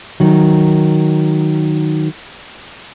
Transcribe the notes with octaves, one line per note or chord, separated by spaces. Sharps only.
D#3 F#3